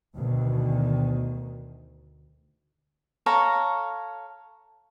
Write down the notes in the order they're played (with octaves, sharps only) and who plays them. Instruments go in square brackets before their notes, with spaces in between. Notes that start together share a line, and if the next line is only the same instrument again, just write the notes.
[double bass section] D2 B2 D#3
[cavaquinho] A4 C#5 F5 A#5